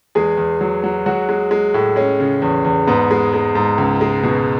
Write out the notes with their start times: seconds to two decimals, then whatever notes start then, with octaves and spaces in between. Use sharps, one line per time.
0.15 E2 G#3 G#4
0.37 E2
0.61 F#3
0.84 F#3
1.06 F#3 G#3 F#4
1.29 G#3
1.51 G#3
1.74 A2
1.96 G#3 C#4
2.20 C#3
2.42 E2
2.65 E2
2.87 G#2 B3
3.11 G#3
3.33 G#3
3.55 G#2
3.78 C#2
4.01 G#3
4.23 B2